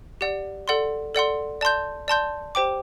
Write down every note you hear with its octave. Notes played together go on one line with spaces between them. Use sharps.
G4 D5 F#5
A4 D5 F#5 C6
A4 D5 F#5 C6
D5 A5 C6 G6
D5 A5 C6 G6
G4 C5 G5 D6